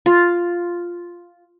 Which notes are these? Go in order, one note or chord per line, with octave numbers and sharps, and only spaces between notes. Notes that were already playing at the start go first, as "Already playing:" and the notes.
F4